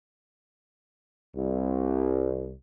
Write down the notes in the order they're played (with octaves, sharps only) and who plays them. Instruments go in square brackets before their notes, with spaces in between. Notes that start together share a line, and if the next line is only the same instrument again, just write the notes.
[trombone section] C2